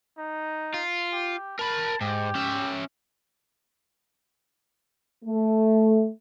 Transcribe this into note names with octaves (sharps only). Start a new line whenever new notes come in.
D#4
F4
G4
A#4 A5 B5
G#2 G4
C#4 E5
A3